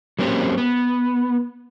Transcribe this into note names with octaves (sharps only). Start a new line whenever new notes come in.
F#3 A#3 C4 C#4 F#4 G4
B3